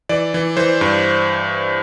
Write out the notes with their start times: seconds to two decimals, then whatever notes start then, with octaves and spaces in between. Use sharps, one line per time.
0.09 E3 D5
0.34 E3
0.57 E3 C5
0.81 G2